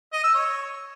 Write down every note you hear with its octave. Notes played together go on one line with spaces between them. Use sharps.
D#5
E6
C#5